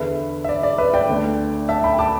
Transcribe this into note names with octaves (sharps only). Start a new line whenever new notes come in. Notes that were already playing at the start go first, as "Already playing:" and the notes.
Already playing: E2 D3 B4 E5
E5
D5
D5
B4 E5
D5 G5
D2 D3
E5 A5
G5 B5
A5 D6